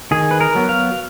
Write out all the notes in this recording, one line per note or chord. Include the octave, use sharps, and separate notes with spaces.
D#3 G#4
B4
A#4
F#3 B3
F5